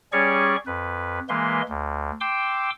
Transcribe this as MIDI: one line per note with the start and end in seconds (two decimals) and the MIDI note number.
0.13 0.56 55
0.13 0.56 61
0.13 0.56 68
0.13 0.56 73
0.13 0.56 74
0.13 0.56 85
0.67 1.20 41
0.67 1.20 71
1.29 1.62 52
1.29 1.62 56
1.29 1.62 58
1.29 1.62 71
1.29 1.62 84
1.69 2.11 38
2.21 2.70 79
2.21 2.70 84
2.21 2.70 86
2.21 2.70 88